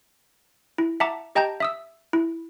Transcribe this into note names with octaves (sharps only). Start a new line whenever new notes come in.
E4
E5 F#5 A5 A#5 D6
G4 D#5 G5 A5 A#5 G6
E5 D#6 E6
E4